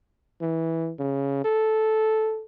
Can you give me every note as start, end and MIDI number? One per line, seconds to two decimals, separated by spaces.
0.41 0.93 52
0.99 1.43 49
1.45 2.45 69